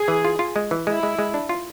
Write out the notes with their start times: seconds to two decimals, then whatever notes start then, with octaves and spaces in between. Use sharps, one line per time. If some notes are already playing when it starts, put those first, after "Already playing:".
Already playing: G#4
0.08 E3
0.25 F4
0.39 F4
0.56 G#3
0.71 E3
0.87 G#3 E4
1.03 G#3
1.19 G#3
1.34 D4
1.49 F4